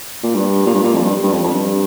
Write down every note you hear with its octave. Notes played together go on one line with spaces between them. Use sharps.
A#2
G2
A#2
G2
A#2
F2
G2
G2
F2
F2
G2